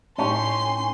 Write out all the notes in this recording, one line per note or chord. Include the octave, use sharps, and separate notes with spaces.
A2 C#4 D#4 G4 C6 C7